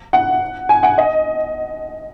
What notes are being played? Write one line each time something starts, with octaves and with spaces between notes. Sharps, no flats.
F#5
G#5
F#5
D#5